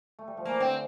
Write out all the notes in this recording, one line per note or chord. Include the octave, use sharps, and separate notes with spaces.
A3
G3
F3
E3 A#3
D3 C4